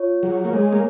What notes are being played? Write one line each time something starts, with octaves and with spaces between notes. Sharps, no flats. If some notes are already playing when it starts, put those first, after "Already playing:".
Already playing: F4 C#5
F#3 G#4
A#3
G#3 C#5
A#3